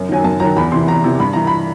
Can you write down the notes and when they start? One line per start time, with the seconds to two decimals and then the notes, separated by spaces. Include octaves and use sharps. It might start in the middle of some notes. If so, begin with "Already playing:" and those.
Already playing: F#2
0.09 D#3 F#3 G#5
0.24 F#2 A5
0.40 D#3 F#3 A#5
0.57 E2 B5
0.72 C3 C6
0.76 E3
0.88 E2 A#5
1.04 C3 E3
1.20 G2 B5
1.33 E3 A#5
1.47 B5